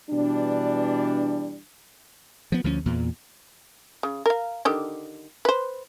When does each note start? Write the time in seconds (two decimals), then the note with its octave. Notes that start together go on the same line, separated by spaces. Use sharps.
0.10 B2 E3 G3 D4
2.52 F3 B3
2.64 D2 F3 F#3 C#4
2.86 E2 A#2
4.03 C#3
4.26 A#4 F5
4.65 D3 D#3 G4
5.45 B4 C5